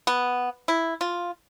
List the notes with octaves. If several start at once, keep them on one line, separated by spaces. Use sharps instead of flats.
B3
E4
F4